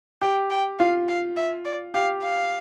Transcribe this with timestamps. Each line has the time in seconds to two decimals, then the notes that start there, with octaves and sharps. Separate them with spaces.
0.21 G4 G5
0.50 G5
0.79 F4 F5
1.08 F5
1.37 E5
1.65 D5
1.94 G4 F5
2.23 F5